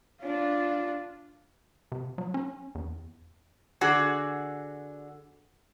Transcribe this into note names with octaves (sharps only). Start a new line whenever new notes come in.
D4 F4
C3
F#3
C#4
E2
D3 F#4 G#4